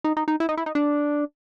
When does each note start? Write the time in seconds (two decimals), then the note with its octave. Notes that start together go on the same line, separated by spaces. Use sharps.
0.04 D#4
0.17 D#4
0.28 D#4
0.40 E4
0.49 D#4
0.57 E4
0.66 D#4
0.75 D4